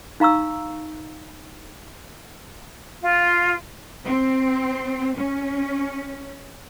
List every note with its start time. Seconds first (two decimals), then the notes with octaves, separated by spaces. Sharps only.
0.20 D#4 F5 A#5 C#6 E6
3.03 F4
4.05 C4
5.17 C#4